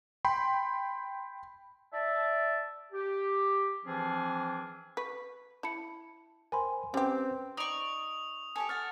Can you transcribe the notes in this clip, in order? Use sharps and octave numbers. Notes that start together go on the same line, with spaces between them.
G5 B5 C6
D5 E5 A5
G4
E3 F3 C4 D4 F4 G#4
B4 C#6 B6
E4 A5 B5 C#7
A#4 C5 G5 G#5 B5 C6
G3 C4 C#4 G4 B4
D#4 D5 C#6 D#6 F7
G4 A4 C#5 G#5
C#5 F#5 F6 A6